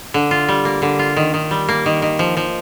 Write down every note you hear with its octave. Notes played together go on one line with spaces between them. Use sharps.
D3
F4
G3
A#3
D3
F4
D#3
D#3
G3
A#3
D#3
D#3
F3
F3